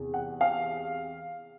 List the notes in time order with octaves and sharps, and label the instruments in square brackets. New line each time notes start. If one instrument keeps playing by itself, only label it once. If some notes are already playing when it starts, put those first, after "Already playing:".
Already playing: [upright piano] E2 C3
F#5
F5